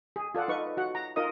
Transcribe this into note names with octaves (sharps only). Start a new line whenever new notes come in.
G#4
F4 A4 D5 F#5
D#4 B4 C#6
F#4 F#5
A#5
D#4 F4 A#4 D#5 D#6